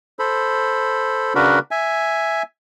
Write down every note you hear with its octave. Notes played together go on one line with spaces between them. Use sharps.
A4 C5 B5
C#3 D4 F#4 A#4 B4 B5
E5 G#5